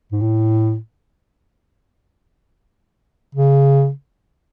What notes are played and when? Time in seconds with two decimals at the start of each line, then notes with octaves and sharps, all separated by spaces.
0.12 G#2
0.21 A2
3.35 C#3